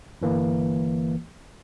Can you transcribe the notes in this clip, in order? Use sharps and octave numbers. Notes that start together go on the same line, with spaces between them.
G1 E3 A#3